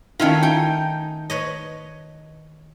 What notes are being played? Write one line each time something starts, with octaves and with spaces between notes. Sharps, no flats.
D#3 A3 C#4 E4 F4
D#4 G5 G#5
B4 C#5 D#5